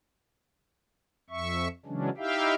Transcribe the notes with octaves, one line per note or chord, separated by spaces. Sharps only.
F2 E5 C#6
C#3 E3 F#3 G#3 C#4 D4
D#4 E4 G4 E5 F5 G5